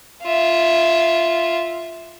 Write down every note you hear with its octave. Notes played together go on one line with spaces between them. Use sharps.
F4 E5